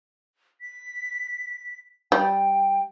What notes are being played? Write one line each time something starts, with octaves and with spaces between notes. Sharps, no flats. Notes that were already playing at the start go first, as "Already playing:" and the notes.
B6
G3 G5